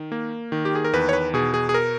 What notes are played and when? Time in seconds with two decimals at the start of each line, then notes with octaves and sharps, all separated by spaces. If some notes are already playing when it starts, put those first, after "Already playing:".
Already playing: D#3
0.12 A#3
0.52 D#3
0.65 G4
0.75 G#4
0.85 A#4
0.93 E2 B4
1.09 C#5
1.13 B4
1.34 B2 G#4
1.54 G#4
1.69 G#4
1.74 A#4